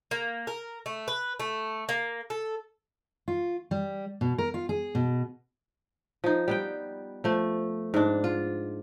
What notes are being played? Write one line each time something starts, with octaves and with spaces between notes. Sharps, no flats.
A#3
A#4
A3
B4
A3
A#3
A4
F4
G3
B2
A#4
F4
G#4
B2
F3 D#4
G3 B3 G5
F3 A3
G#2 D4
F4